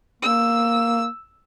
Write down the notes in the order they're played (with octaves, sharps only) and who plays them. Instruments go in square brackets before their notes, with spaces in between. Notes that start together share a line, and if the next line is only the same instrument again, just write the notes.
[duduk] A#3 [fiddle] E6